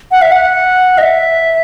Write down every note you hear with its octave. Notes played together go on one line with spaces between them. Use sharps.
F#5
E5
F#5
D#5
E5